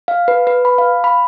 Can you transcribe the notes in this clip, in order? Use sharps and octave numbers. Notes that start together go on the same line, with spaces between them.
F5
B4
B4
B5
F5
B5